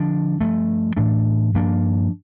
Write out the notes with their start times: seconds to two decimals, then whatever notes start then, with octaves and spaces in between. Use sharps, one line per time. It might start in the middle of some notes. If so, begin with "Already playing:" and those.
Already playing: D3 F3 D4
0.41 G2 F3 A3
0.97 A2 E3 A3 D4
1.54 G2 F3 A#3 D4